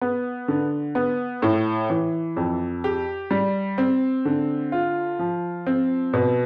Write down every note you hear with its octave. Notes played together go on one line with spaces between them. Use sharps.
B3
D3
B3
A2
E3
F2
G4
G3
C4
D3
F4
F3
C4
B2